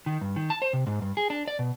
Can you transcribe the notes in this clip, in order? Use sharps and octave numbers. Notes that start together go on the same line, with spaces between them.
D#3
G2
D#3
A5
C5
C3
G#2
G2
G#4
D4
D5
B2